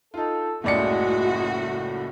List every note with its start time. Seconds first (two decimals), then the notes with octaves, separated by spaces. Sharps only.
0.14 D#4 F4 A4
0.64 F#1 C#2 A2 G#3 A3 F#4 D5 C#7